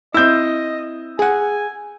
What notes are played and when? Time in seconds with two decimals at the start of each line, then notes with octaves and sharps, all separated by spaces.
0.14 C4 E4 D#5 E6 G6
1.19 G#4 F#5 G#5